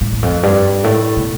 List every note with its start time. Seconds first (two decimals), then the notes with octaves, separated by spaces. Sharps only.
0.01 A2
0.13 E2
0.23 F2
0.43 G2
0.84 A2
1.17 B2